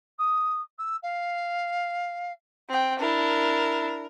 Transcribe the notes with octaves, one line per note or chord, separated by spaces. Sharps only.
D#6
E6
F5
C4 G5
D4 E4 A#4